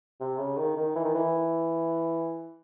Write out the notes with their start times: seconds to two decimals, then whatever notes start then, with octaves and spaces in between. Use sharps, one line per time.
0.20 C3
0.38 C#3
0.58 D#3
0.77 D#3
0.95 E3
1.05 D#3
1.15 E3